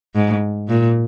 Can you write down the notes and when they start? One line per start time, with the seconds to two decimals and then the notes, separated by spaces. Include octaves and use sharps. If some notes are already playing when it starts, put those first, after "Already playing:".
0.15 G#2
0.69 A#2